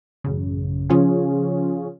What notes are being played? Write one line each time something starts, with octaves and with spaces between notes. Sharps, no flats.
A1 F#2 C#3
C#3 F3 C#4 F4 G#4